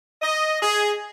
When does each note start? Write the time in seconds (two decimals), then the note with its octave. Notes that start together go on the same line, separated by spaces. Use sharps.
0.21 D#5
0.62 G#4